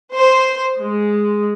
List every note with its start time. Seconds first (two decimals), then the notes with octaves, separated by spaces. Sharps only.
0.15 C5
0.79 G#3